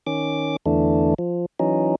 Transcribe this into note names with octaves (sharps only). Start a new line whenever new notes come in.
D#3 C#4 D6
E2 D3 E3 A3 D4
F3
E3 F#3 C#4 D#4